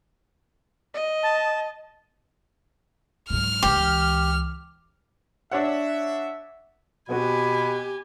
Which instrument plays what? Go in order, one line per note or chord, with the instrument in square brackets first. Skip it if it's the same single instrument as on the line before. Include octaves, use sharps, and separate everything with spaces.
[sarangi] D#5
[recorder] A5
[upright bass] G#2 F#3 [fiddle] F6
[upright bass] C#2 E3 [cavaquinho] G4
[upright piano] D4 C#5 F#5 [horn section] E5
[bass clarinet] B2 [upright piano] B3 C4 F#4 [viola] G4 G#5 [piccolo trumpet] B5